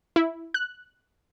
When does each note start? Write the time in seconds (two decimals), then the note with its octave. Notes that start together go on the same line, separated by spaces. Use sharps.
0.16 E4
0.54 F#6